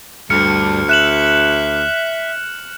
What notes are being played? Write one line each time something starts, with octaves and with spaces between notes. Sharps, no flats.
D2 G2 F6 C#7
E5 F#6 E7 F#7